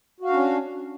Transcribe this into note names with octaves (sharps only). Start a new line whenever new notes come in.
C#4 D4 F#4 F5